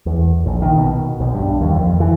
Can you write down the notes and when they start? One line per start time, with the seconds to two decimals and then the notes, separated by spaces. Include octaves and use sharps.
0.06 E2
0.46 A#1
0.62 D#3
0.78 B2
1.20 B1
1.34 G2
1.61 D#2
1.76 F2
2.00 E3